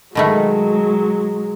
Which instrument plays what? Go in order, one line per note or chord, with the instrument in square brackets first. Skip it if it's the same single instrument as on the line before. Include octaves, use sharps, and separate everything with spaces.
[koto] B2 D#3 A3 [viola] F#3 G#3